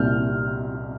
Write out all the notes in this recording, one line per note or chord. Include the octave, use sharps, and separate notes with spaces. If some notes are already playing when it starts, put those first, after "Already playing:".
Already playing: C2 A#2 G3 F6 G6